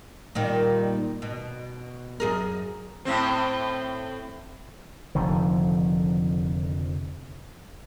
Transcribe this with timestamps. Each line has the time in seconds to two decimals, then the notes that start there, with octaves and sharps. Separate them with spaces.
0.35 A#2 D#3 G3
1.22 B2
2.20 F#2 G#4 A#4
3.05 A2 C4
5.15 F1 F2 D3 D#3